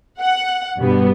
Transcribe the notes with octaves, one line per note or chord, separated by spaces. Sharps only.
F#5
G2 B2 G3 B3